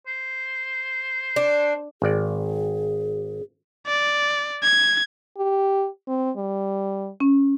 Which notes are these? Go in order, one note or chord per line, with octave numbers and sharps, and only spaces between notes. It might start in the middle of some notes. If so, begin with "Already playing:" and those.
C5
D4
G#1 G#4 D5
D5
G#6
G4
C4
G3
C#4